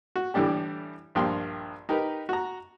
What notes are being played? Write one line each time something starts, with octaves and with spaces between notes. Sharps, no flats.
F#4
A2 D3 E3 G3 D4 G4
A#1 G2 F3 G5 C6
D#4 G4 A#4 B4
F#4 A#5